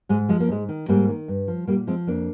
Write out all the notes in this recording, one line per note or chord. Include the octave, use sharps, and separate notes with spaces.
G#2 G#3
F3 G#3
A#3
G#2 G#3
D#3
G#2 G3 A#3
D#3
G2
F3
A#2 G3 A#3
F3 G#3 C4
F2 A#3 D4